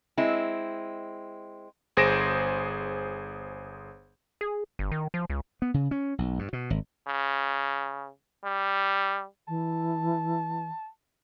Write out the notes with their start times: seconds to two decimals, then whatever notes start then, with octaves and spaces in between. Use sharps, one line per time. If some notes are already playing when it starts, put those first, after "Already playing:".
0.17 G#3 C4 E4
1.97 G1 G#4 C5 A#6 D7 E7
4.41 G#4
4.79 G1
4.92 D#3
5.14 F3
5.30 C#2
5.62 B3
5.74 C#3
5.91 C#4
6.18 B1
6.39 G2
6.53 B2
6.70 G#1
7.07 C#3
8.44 G3
9.48 E3 A5